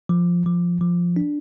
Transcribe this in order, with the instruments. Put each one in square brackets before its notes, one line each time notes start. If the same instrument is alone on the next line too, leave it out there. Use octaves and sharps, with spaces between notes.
[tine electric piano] F3
F3
F3
D4